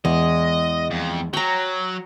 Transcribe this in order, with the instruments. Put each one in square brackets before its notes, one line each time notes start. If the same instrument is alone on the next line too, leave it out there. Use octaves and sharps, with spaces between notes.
[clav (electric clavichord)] E2 [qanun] G#3 [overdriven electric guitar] D#5
[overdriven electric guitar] F2
[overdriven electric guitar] F#3 [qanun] G5 A#5